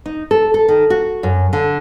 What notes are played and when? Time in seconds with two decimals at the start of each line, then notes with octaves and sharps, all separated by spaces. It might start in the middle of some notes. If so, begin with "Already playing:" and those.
0.06 D#4
0.31 A4
0.54 A4
0.68 D#3
0.90 F#4
1.23 F#2
1.53 D3